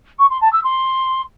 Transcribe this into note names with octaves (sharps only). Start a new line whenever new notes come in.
C#6
C6
A5
E6
C6